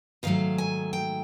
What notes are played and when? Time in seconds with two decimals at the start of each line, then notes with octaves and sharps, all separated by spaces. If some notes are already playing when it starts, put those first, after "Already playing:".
0.23 G#2 D#3 F#3 A3 F5
0.58 G#5
0.93 G5